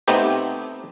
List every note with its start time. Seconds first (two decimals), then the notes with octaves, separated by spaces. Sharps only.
0.08 C3 A3 B3 C4 D#4 G4